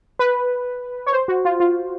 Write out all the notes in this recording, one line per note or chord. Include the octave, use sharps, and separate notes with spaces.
B4
C#5
C5
F#4
F4
F4